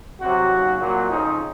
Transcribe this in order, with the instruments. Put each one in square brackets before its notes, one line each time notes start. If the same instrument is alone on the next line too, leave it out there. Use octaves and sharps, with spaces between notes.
[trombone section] C2 C3 F#3 F#4
D#2 C#3 F#3
C2 A#2 F#3 F#4
F2 C#3 F3 D#4